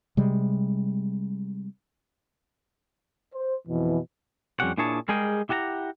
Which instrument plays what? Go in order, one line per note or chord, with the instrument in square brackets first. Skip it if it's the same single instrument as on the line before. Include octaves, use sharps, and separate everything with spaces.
[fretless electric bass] C3 G3 G#3
[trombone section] C5
F2 B2 E3
[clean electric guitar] F2 G3 C#4 G4 F#5
A#2 D4 E4 G#4 C#5 A5
G3 G#3 G#4 A#4 D#5 G5
E4 G4 F#5 A5 A#5